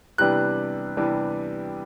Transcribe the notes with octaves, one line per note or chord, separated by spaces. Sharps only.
C3 E3 G3 B3 D4 F#6
C3 E3 G3 B3 D4